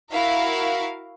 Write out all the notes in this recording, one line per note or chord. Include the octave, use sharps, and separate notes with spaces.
E4 F#4 A#4 F5